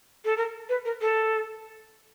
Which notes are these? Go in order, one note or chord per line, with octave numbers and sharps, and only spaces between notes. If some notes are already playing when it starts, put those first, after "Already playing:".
A4
A#4
B4
A#4
A4